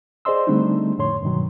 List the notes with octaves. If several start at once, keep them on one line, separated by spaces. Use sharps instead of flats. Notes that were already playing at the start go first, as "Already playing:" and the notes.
G#4 C5 D5 D#5 C6 E6
D3 G3 A3 C4 D4 D#4
F2 A2 D3 C#5 C6
G2 B2 D#3 F#3